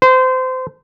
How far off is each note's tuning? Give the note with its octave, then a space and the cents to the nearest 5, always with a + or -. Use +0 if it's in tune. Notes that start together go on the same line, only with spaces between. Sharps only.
C5 -25